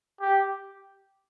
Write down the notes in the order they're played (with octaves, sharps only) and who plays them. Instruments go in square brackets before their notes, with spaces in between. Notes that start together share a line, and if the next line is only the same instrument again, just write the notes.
[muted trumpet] G4